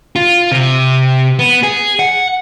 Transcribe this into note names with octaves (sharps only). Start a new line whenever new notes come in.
F4
C3
B3
G#4
F#5